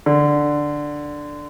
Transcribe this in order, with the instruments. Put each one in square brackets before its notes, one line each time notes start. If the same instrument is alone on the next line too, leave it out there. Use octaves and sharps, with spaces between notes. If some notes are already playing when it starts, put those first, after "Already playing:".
[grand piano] D3